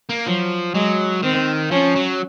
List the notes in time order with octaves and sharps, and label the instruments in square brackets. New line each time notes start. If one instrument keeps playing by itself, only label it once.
[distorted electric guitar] A#3
[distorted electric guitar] F3 [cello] F#3
[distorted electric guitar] F#3 [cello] G#3
[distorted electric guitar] D#3 [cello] C4
[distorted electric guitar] F3 [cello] C#4
[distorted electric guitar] F#3